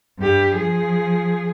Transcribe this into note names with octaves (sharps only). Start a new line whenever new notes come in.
G2 G4
F3 G#4